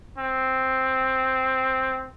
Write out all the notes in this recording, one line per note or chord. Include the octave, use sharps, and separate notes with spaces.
C4